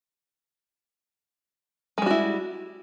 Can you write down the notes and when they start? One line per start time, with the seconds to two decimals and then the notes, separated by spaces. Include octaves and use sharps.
1.98 G#3
2.02 G3
2.06 F#4
2.11 E4